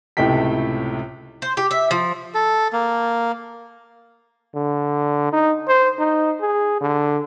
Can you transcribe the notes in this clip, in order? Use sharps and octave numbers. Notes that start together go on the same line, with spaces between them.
C#2 A2 C3 A3 G5 B6
C5
G4
E5
F3
A4
A#3
D3
D#4
C5
D#4
G#4
D3